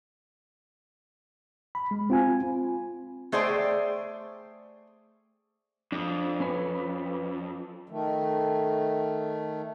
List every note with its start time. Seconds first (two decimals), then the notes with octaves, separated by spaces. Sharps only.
1.75 B5
1.91 G#3
2.10 C4 F4 G#5
3.32 A3 G#4 C5 D5 G5
5.92 F2 D4
6.40 C#4 B4 C#5
7.89 D#3 A3